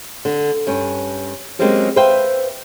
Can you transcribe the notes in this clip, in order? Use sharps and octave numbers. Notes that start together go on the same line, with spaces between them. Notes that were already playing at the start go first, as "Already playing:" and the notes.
D3
G2 C#4
F#3 G#3 A#3 C4 C#4 G4
B4 C5 E5 F5 G5